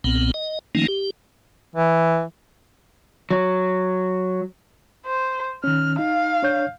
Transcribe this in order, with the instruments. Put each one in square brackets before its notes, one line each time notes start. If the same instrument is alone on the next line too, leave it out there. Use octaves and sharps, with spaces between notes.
[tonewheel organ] B1 A#2 B3 C4
D#5
D#3 F3 A3 A#3 C#4 D#4
G4
[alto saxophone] E3
[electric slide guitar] F#3
[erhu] C5
[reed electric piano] D#3 C#4 [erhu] F6
[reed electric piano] D#4 [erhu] F5
[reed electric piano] D4 C#5 G6